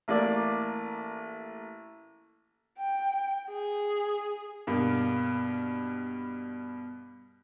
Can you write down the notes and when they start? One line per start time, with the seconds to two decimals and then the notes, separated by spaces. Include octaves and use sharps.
0.08 A1 A#3 D5 D6
2.79 G5
3.51 G#4
4.67 G2 B2 A#3